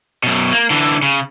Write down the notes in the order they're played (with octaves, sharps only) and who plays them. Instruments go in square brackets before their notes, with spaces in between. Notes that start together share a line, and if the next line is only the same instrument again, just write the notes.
[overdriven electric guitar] F#2 B2
A#3
D3 E3
C#3